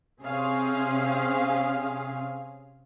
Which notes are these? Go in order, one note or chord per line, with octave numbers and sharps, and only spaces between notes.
C3 C4 C#4 G#4 F5